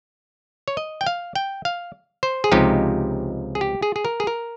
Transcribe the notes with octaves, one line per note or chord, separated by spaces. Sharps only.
C#5
D#5
G5
F5
G5
F5
C5
G#4
C#2 C3 F3 G#3 D#4 G4
G#4
G4
G#4
G#4
A#4
G#4
A#4